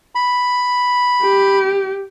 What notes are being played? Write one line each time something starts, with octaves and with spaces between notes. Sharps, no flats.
B5
G4